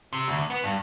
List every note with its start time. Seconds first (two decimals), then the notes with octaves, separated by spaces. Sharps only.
0.13 C3
0.28 D2
0.50 B3
0.64 G2